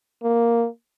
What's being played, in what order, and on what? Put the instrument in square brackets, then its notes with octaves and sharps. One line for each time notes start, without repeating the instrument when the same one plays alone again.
[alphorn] A#3